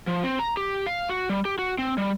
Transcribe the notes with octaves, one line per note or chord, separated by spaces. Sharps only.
F3
C4
A#5
G4
F5
F#4
G3
G4
F#4
C4
G3